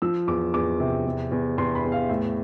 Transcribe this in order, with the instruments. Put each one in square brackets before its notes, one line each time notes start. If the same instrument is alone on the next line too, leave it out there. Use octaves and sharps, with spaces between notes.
[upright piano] F3 E6
E2 D6
E2 D6
C3
E2
E2
E2 C6
B5
E2
F5
A2 E5